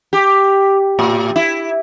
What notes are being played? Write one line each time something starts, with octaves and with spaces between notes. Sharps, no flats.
G4
A2
E4